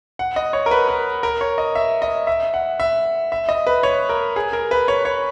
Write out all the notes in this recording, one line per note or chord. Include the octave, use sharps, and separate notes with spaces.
F#5
D#5
C#5
A#4
B4
A#4
A#4
C#5
D#5
E5
D#5
E5
F#5
E5
E5
D#5
B4
C#5
A#4
G#4
A#4
B4
C#5
C#5